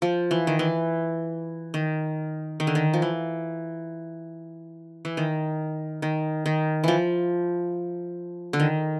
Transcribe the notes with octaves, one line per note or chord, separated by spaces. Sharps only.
F3
E3
D#3
E3
D#3
D#3
D3
D#3
F3
E3
E3
D#3
D#3
D#3
E3 F3
D3
D#3